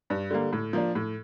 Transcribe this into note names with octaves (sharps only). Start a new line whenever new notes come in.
G2
D3 G3 A#3
A2
F3 A#3 D4
A2